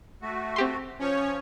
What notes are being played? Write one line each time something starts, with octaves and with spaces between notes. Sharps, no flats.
A3 F#4
C4 G4 C6
F3 C#4 C#5